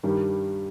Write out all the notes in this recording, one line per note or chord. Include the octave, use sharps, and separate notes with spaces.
G2 D#3 G3